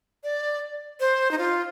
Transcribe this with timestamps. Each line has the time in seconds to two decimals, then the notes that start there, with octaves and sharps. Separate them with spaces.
0.24 D5
1.00 C5
1.31 D#4
1.38 F4